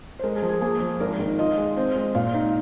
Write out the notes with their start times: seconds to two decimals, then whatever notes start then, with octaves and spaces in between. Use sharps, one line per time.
0.19 C5
0.24 G#3 A#4
0.36 G#4
0.42 F3
0.49 G#4
0.61 A#3 G#4
0.80 F3
1.00 G#1 A#4
1.19 D#3
1.39 F4 D#5
1.58 G#3
1.77 C4
1.96 G#3
2.15 A#2 F5
2.34 D#4